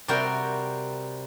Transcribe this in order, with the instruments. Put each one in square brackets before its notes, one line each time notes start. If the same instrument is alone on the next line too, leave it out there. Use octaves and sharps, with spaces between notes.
[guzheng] C3 G3 F#4 A#4 G5